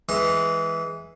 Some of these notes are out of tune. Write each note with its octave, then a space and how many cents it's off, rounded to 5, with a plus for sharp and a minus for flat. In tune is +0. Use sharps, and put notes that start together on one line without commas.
E3 -5 G#3 +0 C6 +45